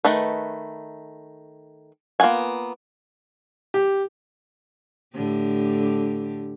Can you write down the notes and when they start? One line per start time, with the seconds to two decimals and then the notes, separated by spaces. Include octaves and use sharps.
0.05 D#3 A3 B4
2.20 A#3 B3 F4 F#5 G#5
3.74 G4
5.15 A2 D3 G4